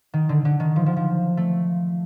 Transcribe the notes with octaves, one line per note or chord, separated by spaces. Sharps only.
D#3
D3
D3
D#3
F3
F3
F3
A3